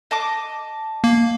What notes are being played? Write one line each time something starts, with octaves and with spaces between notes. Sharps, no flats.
D#5 A5 D6
A#3